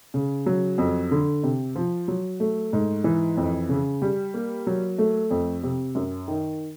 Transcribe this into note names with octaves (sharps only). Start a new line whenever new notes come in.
C#3
F#3
F2
D3
C3
F3
F#3
A3
G#2
E3
F2
C#3
G3
A#3
F#3
A3
F2
C3
F#2
D#3